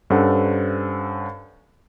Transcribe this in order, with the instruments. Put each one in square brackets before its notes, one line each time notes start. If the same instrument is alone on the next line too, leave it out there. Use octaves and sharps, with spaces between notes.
[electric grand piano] G2 C#4 A4 C5 F#5